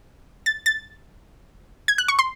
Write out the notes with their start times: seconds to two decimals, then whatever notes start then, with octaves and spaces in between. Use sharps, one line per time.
0.46 A6
0.66 A6
1.88 G#6
1.98 F#6
2.08 C#6
2.19 C6